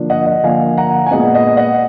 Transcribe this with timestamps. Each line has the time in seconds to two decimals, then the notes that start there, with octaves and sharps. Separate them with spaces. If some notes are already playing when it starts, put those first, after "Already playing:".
Already playing: D3 F3 A#3 D4
0.10 D#5 F#5
0.26 D#5 F#5
0.44 D3 F3 A#3 D4 F5 G#5
0.77 F#5 A#5
1.07 G#5
1.11 A#2 G#3 B3 D#5 F#5
1.35 D#5
1.57 D#5 F#5